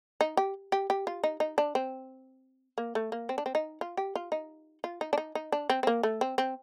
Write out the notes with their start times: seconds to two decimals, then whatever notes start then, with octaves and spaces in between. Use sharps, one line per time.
0.21 D#4
0.37 G4
0.72 G4
0.90 G4
1.07 F4
1.24 D#4
1.40 D#4
1.58 D4
1.75 C4
2.78 A#3
2.95 A3
3.12 A#3
3.29 C4
3.38 D4
3.46 C4
3.55 D#4
3.81 F4
3.97 G4
4.15 F4
4.32 D#4
4.84 F4
5.01 D#4
5.13 D4
5.18 D#4
5.35 D#4
5.52 D4
5.70 C4
5.83 C4
5.87 A#3
6.03 A3
6.21 C4
6.38 C4